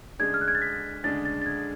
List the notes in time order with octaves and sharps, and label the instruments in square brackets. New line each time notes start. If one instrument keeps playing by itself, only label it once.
[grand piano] D2 C#3 G#3 D4 G#4 [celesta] G#6
[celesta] F6
F#6
G#6
A6
B6
[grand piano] D2 C#3 G#3 D4 G#4 [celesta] A6
[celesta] A6
A6
G#6